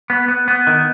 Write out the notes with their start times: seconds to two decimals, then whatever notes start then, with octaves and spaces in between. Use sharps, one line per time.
0.10 B3
0.28 B3
0.48 B3
0.67 D#3